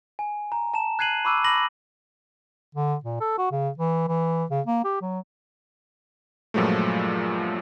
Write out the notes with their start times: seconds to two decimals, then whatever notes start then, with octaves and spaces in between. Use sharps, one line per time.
0.19 G#5
0.52 A#5
0.74 A5 E7
0.99 F#6 G#6 C7 D#7 F#7
1.25 B5 C#6 D6 E6 F#6 D#7
1.44 B5 D6 A#6 F#7
2.75 D3
3.04 A#2
3.21 A4
3.38 F#4
3.52 C#3
3.78 E3
4.08 E3
4.50 C#3
4.67 A#3
4.85 G4
5.01 F#3
6.54 G2 A#2 F3 F#3 G#3 A3